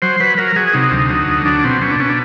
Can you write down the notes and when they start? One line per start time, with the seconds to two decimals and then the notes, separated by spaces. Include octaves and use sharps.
0.02 F#3 C5
0.20 F#3 B4
0.37 F#3 A#4
0.56 F#3 G#4
0.73 C3 D#4
0.91 D2
1.10 F#3
1.28 D2
1.45 F#3 D4
1.64 B2 C4
1.81 B2 C#4
1.91 D4
2.00 B2 C#4
2.09 D4